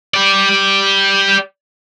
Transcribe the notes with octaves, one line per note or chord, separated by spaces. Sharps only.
G4 D5